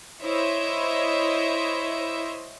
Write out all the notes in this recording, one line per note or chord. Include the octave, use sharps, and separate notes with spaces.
E4 C5 C#5 D#5 E5